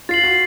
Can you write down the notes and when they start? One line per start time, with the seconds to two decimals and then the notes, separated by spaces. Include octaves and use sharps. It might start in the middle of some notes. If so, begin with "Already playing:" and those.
0.09 F4 A6 C7 F#7
0.23 F#4